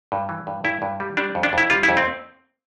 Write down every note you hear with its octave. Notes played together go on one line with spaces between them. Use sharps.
G2
E3
G2
G2 E4
G2
G3
G3 D4
F2
D4
F2 E4
G3 F4
E4
F2
C4